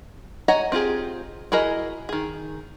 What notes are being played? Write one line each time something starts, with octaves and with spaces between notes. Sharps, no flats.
C#5 D#5 F#5 G#5 A#5
C4 F4 G4 G#4
E4 F#4 G#4 A#4 D#5
D#3 G#4